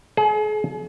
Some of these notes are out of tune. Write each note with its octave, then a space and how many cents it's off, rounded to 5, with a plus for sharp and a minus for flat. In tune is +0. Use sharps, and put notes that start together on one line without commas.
G#4 +40